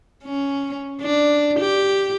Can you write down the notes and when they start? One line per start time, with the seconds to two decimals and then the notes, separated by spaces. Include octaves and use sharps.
0.23 C#4
1.01 D4
1.60 G4